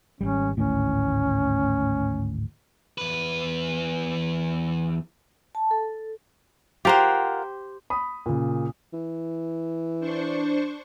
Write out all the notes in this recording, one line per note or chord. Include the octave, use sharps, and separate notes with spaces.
G#1 C#2 G3 C#4
G#1 D2 A2 C#4
E2 B4
A5
A4
F4 G4 A#4 C5 F#5
B5 D#6
A#2 C#3
E3
D4 C5 C#6